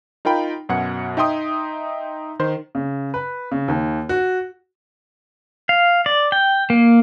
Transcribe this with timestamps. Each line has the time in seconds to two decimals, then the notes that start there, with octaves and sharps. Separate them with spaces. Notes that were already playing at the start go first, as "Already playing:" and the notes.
0.25 D#4 F4 A#4 G5 B5
0.69 F#2 B2 F#5 G#6 C#7
1.17 D#4 E5 G5 C6 D#6
2.39 D#3 C5 C6
2.75 C#3
3.14 B4
3.51 C#3
3.68 D#2
4.09 F#4
5.69 F5
6.06 D5
6.32 G5
6.70 A#3